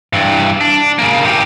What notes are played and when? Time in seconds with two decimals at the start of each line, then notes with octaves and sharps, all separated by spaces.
0.13 G2 E3
0.61 D4
0.99 C#3 A#3
1.23 A2 G4